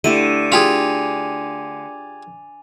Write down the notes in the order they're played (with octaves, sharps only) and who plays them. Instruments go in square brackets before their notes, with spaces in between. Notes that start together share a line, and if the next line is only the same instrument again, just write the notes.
[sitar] D3 [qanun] A3 E4 G4 [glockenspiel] D#7 E7
[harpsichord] F4 G4 G#4 [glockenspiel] G#5 F7 [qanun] B5